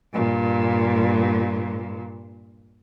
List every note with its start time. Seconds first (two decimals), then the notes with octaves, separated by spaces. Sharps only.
0.13 G2 A#2